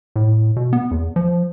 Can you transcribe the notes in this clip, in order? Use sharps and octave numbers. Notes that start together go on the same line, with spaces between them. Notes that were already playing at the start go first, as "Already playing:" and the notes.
A2
B2
B3
E2
F3